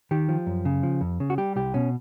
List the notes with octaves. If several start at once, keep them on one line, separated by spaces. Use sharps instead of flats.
D#3 G4
F3
F#2
C#3
F3
F2
C#3
F#4
G3 G4
C2 G4
B2 C#4